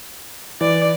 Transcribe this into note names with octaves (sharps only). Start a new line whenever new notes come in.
E3 D5